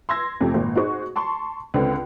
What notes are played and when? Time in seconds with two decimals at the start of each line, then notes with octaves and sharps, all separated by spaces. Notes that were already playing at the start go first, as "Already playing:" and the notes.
0.09 C6 E6 G#6 A#6
0.40 F2 C3 A3
0.54 G#1 A#2
0.76 D#4 F#4 G#4 C5 C#6
1.16 A5 C6 C#6
1.74 C#2 D3 C4 F4 B4